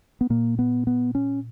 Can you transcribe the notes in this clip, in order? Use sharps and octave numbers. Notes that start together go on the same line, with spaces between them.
B3
A#2 A#3
B3
B3
C#4